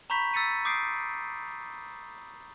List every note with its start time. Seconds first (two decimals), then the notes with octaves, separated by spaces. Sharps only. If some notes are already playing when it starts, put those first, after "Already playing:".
0.10 A#5 B5 C#6 G6 B6
0.34 E6 A6 B6 C#7 D#7
0.65 D6 D#6 G6 C7 D7